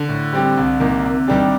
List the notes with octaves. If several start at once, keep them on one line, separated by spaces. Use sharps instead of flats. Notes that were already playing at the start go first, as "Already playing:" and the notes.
Already playing: D3
A2
G3 C4 G4
C2
C3 D#3 A#3
C3
D#3 G3 D4 G4